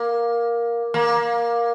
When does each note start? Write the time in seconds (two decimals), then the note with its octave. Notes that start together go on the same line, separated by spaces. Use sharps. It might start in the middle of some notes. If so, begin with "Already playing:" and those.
Already playing: A#3
0.94 A#3